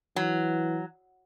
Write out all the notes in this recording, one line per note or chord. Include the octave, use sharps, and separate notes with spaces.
E3 F#3